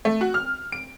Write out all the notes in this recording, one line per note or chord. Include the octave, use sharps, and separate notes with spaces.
A3
F#4
F6
D7